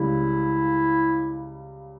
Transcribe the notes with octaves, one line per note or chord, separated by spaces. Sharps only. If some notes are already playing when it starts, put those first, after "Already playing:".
Already playing: C#2 C#3 G3 E4